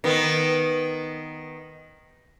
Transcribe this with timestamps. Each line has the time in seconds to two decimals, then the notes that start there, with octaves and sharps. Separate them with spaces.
0.04 D#3 B3